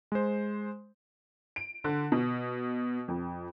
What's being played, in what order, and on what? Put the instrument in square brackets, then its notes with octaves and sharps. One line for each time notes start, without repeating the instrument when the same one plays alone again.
[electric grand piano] G#3 C5
[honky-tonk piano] D7
D3
B2
F2